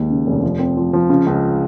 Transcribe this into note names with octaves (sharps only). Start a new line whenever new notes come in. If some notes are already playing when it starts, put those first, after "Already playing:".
Already playing: D#2 G#3
C#3
F1
F3
C4
F3
F3
C#3
C#2